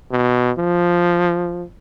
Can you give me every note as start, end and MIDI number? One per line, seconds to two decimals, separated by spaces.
0.11 0.51 47
0.58 1.63 53